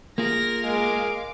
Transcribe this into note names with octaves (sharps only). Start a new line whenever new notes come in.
A#3 F4 G#4 A#4 A#6
G#3 F5 D6